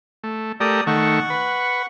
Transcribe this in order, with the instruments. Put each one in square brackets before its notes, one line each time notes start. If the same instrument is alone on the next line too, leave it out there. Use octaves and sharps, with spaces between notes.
[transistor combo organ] A3
[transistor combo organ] A3 G4 A#4 [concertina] D5 D#6
[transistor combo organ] D#3 A3 [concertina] F#5 C#6
[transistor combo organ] B4